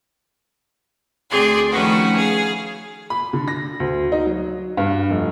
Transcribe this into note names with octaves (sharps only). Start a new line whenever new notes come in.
D2 C4 G#4 D5 C6
D#3 F3 A3 C#4 F#4 B4
G#4 F5
B5
D3
A#6
D2
D#4
F#3
G2
F1